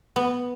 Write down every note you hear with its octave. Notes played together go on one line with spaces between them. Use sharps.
B3